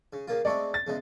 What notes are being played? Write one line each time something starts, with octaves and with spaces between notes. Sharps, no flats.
C#3
C#3 A#3 F4
G#3 A3 C4 D5 C#6
A6
E2 C#3 G#3